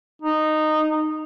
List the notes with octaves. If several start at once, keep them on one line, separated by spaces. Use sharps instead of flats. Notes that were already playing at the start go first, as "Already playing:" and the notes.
D#4